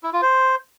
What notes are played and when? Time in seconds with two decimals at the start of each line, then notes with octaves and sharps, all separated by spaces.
0.03 E4
0.13 F4
0.22 C5